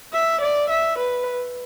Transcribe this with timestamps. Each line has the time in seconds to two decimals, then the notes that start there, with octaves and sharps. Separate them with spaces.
0.14 E5
0.42 D5
0.71 E5
0.99 B4